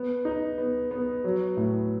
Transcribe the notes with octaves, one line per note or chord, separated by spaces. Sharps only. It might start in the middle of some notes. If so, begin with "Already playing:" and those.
Already playing: B3
D#4
B3
B3
F#3
A2